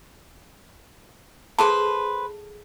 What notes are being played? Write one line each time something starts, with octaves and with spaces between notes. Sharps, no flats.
G#4 A4 B4 C5 A5 B5